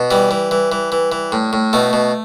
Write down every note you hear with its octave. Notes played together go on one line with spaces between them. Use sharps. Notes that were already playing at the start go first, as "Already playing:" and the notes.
Already playing: B2
E3 G3
E3
E3
E3
E3
E3
A2
A2
B2 A3
B2